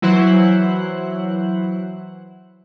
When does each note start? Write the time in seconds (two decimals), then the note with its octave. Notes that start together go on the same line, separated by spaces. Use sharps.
0.02 E3 F#3 E4 C5 F#5 F#6